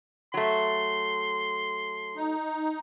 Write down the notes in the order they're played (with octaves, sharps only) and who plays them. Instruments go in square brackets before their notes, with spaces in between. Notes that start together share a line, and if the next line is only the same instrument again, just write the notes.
[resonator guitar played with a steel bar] F#3 A3 [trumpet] C6
[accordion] D#4